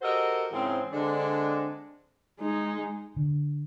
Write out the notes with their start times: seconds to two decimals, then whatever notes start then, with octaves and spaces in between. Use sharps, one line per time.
0.02 F#4 G4 A4 A#4 C5 D#5
0.51 G#2 C#3 E3 C4
0.92 D3 G#3 C4 D4
2.39 G#3 D#4
3.16 D3